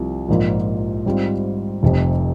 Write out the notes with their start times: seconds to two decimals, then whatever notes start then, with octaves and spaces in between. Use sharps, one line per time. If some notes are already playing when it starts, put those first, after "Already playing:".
Already playing: C2 C3 F3
0.28 A#1 G#2 F3 A#3 F4
1.06 G#2 G3 C4 F4
1.83 F1 F2 C3